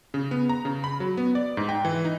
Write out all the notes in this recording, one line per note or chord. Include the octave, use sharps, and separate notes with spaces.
C#3
B3
A#5
C#3
B5
F#3
B3
D5
G#2
G5
E3
D#4